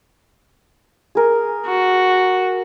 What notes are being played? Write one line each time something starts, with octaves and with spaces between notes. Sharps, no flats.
G#4 A#4
F#4